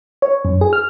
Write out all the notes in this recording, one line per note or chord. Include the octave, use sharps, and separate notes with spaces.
C#5
F#2
G#4
F6